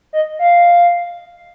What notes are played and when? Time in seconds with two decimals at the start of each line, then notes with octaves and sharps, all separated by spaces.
0.13 D#5
0.39 F5